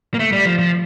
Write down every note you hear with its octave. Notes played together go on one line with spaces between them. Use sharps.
A#3
A3
G3
F3
F3